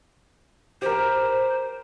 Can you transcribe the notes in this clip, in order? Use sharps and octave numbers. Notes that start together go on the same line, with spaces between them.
G4 A#4 C5